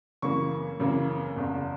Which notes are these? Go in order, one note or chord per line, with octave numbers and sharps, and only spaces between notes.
F#2 C#3 E3 A#3 C#6
F#2 C#3 E3 A#3
F#1 E2 C#3